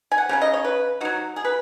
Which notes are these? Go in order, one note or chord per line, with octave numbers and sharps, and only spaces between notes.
G#5
F#5
C#3 F#3 C#4
D#5
C#5
B4
F#3 D#4 F#4
G#4
B4